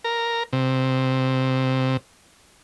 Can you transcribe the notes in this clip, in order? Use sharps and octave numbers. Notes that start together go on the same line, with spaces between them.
A#4
C3